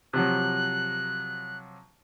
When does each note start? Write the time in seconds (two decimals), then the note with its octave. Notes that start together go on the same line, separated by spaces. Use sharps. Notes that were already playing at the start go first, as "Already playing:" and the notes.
0.13 C3 F3 F#3 F#6